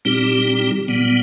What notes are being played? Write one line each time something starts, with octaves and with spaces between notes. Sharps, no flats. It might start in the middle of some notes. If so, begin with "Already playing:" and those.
A#2 G3 C4 D#4 G4
A#2 G3 B3